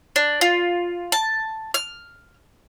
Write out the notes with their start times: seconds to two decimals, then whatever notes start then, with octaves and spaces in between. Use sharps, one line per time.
0.16 D4
0.41 F4
1.12 A5
1.74 F6